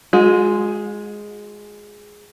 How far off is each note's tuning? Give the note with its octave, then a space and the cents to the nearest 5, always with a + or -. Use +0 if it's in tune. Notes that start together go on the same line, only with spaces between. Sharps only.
G#3 +0 F#4 -40